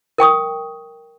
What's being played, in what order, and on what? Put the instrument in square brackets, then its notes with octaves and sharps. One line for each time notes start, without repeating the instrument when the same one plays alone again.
[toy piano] A#4 G5 C#6 D#6